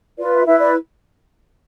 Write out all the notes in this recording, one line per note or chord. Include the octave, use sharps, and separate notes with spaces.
F4 B4 D5
E5
E4 B4 E5
D5